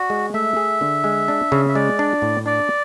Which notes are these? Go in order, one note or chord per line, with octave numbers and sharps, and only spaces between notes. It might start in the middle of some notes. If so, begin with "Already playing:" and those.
Already playing: F#4 D5
G#3
A3 E5
G#4
D3
G#3
D4
C#3
E5
G#3 D5
D4
A2
D4 D5